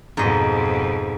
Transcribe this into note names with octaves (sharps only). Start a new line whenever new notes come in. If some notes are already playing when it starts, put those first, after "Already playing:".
F2 G#2 B2 D#5